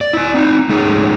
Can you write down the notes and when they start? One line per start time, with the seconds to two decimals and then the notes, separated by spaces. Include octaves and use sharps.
0.01 D5
0.13 E4 D5
0.34 C4 D#4
0.69 G#3 A3 C#4 D#4 G#4 C#5